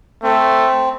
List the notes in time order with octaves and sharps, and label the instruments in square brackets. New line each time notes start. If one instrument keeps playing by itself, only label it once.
[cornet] A3 [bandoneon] C4